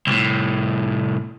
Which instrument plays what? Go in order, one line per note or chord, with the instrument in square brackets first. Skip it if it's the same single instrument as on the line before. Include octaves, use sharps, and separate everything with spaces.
[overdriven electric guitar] C2 A2